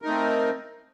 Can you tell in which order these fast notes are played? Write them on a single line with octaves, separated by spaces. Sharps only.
A#4 D#4 A3 C4